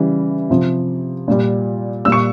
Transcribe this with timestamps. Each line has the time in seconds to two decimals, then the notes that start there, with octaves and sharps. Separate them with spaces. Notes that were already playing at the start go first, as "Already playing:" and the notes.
Already playing: C#3 E3 G3
0.50 C3 F3
1.28 A#2 G3
2.05 A#2 G3 E6
2.12 C#6